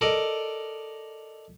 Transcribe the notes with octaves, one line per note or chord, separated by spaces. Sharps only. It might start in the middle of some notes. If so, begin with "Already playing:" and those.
A4 A#4 D5 D#5